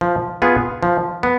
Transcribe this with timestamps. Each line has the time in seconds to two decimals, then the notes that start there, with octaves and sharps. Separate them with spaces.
0.01 F3
0.42 B3 F4 G#4
0.83 F3
1.23 B3